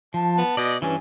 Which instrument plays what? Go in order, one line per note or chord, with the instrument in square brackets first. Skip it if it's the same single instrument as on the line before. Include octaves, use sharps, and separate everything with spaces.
[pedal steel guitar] F3 [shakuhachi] A5
[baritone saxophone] B3
[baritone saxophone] B2 [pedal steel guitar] D5 D#5
[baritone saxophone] G2 [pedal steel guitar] E3 C#4 [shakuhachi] G#5